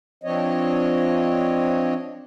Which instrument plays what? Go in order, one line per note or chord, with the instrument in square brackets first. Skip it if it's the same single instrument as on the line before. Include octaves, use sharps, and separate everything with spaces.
[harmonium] F3 C4 D4 C#5 D#5